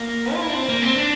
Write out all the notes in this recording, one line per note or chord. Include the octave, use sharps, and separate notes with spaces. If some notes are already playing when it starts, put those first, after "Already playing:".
Already playing: A#3
F4
E4
D4
C4
A#3
C4
D4